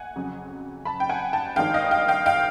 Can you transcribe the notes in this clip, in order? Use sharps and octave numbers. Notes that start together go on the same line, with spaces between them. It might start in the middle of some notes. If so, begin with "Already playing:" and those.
Already playing: F#5 G#5
F2 C#3 F#3
A5 B5
G5
F#5 G#5
G5 A5
G#1 G2 D#3 G#3 F5 G5
D#5 F5
F5 G5
F5 G5
F5 G5